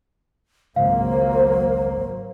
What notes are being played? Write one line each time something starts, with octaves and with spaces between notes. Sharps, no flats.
G#1 C#2 F#3 A#3 C5 F5